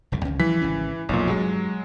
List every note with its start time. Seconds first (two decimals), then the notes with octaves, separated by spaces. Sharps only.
0.12 F1 C2 A2
0.25 C#2 D#3 C#4
0.39 E3 F3 G3 B6
0.61 G#1 C#3 C#4
1.09 F1 B1 A#2
1.27 G2 F#3 G#3